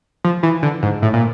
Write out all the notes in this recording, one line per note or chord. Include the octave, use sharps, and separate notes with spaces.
F3
E3
D3
G#2
A2
A#2